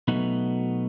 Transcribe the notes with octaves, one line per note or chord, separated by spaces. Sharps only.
B2 F#3 A3 B3 D#4 F#4